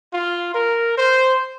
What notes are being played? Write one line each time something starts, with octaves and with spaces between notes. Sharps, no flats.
F4
A#4
C5